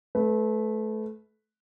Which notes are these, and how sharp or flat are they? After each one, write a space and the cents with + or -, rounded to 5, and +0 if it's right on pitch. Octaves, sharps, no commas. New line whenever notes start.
A3 -25 B4 +0